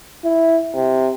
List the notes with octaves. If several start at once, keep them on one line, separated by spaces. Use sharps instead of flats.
E4
C3